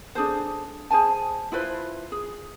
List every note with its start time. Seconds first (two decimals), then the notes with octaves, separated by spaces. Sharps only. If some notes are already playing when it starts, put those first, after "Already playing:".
0.15 D4 G#4 A4 C5
0.90 G#4 C5 G#5 A5
1.52 E4 F4 B4 C5
2.12 G#4